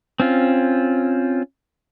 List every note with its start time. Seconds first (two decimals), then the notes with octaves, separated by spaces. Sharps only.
0.20 C4 C#4 F4